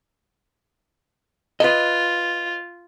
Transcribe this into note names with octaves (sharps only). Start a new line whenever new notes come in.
F4 B4 D#5